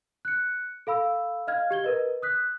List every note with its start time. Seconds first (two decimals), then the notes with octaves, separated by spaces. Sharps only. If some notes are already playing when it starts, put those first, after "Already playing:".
0.25 F#6 C#7
0.87 A4 F5 B5 E6
1.47 D#5 F5 F6 G#6
1.71 G4 G#6 G7
1.84 A#4 B4 D#5
2.22 D#6 F#6 B6